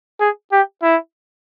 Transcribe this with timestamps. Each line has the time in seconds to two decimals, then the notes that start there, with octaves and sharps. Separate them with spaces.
0.20 G#4
0.52 G4
0.82 E4